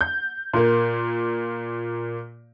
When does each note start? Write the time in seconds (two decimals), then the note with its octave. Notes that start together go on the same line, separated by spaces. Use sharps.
0.01 G6
0.53 A#2 A#3